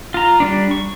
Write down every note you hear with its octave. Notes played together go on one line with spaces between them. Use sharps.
F4 A#5
G3 A3 D4
C#6